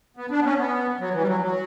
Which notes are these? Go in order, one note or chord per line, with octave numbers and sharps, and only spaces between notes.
B3
D4
B3
C#4
B3
F#3
E3
G3
F#3
F#3